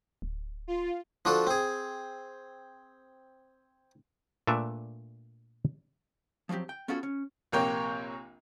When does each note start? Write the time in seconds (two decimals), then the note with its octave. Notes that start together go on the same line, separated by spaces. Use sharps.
0.22 D1
0.68 F4
1.25 F3 D4 F4 F#4 A4
1.47 C4 G#4
4.47 A#2 A3 D4 B4 E5
6.49 F3 F#3 A#3 C4 G4
6.69 G5
6.88 B3 C#4 F4 F#4 G#4 A4
7.03 C#4
7.52 A#1 C3 A#3 C#5 G5